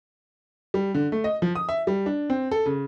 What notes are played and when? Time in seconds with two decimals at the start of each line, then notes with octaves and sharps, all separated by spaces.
0.74 G3
0.95 D3
1.12 A3
1.24 D#5
1.42 F3
1.55 D#6
1.69 E5
1.87 G3
2.06 D4
2.30 C4
2.51 A4
2.66 C#3